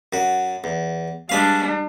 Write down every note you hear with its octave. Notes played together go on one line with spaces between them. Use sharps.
F#2 F#4
E2
G3 G#3 D4 B4 F5